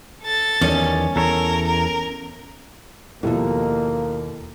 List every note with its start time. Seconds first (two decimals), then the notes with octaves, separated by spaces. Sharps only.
0.23 A4 A6
0.61 E2 D#3 G3 C#4
1.16 E2 A4 A#4 C#5
1.67 A#4
3.23 D#2 G#2 B2 F3 A#3 E4 G4 A4